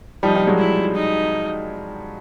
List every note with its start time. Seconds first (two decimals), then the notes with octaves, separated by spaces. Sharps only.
0.23 F3 G3 D#4
0.35 F3 G3
0.47 F#3 G#3
0.59 E4
0.95 D#4